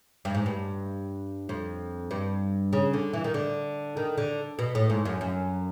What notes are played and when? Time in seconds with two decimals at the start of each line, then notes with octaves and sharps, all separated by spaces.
0.25 G2
0.35 G#2
0.46 G2
1.49 F2
2.11 G2
2.73 C#3
2.93 D3
3.13 E3
3.24 D#3
3.34 D3
3.97 D#3
4.18 D3
4.59 B2
4.75 A2
4.90 G#2
5.05 F#2
5.21 F#2